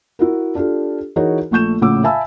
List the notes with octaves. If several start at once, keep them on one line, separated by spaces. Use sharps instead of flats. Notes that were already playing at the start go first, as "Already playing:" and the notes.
E4 F#4 A#4
D4 F4 G4 A4
E3 D#4 F#4 G#4 A#4 C#5
A#1 A3 C#6 G6 E7
A#1 A2 C#3 F#5 D6 E6
E5 F5 G#5 A5 B5 E6